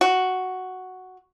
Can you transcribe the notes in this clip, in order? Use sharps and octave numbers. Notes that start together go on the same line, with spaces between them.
F#4